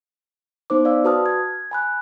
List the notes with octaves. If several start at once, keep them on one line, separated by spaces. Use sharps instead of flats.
B3 D#4 C5 D6
D5 F5 E6
F#4 B4 A5 D#6 F6
G#6
G#5 B5 F#6